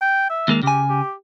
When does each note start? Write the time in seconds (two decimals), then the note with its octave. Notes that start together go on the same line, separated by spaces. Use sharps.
0.01 G5
0.30 E5
0.48 D#2 G#3 A#3
0.63 C#3 G4 G#5
0.89 G4